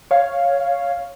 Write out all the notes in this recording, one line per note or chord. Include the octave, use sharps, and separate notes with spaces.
C#5 F5